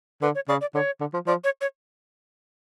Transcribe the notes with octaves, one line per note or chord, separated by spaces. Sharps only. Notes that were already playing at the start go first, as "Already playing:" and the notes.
D3 B4
C#5
C#3 D5
D5
D3 C#5
D3
F3
F3 D5
C#5
C#5